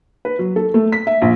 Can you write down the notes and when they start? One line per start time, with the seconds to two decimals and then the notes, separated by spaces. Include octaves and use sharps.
0.25 B4
0.39 F#3
0.56 A4
0.74 A3
0.92 B6
1.07 E5
1.22 A#1